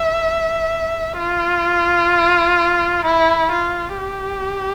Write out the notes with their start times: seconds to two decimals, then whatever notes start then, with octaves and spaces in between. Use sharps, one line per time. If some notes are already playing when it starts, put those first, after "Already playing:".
Already playing: E5
1.19 F4
3.05 E4
3.52 F4
3.98 G4